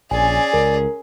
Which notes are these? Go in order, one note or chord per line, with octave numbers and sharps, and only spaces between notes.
A#1 C#4 G#4 D5 G#5
C#2 A#4